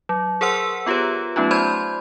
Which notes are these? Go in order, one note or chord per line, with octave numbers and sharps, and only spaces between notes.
F#3
G#4 A#4 C5 F#5 C6 E6
B3 F4 G4 B4 C#5
F#3 A3 B3 C#4 D#4 F4
C5 D5 B5 C6 G6 G#6